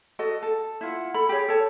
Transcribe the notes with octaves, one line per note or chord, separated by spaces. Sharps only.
F#4 A4 D#5
A4
E4 F4 F#5
A4 B5
G4 G#4 C#5
A4 C#5 A5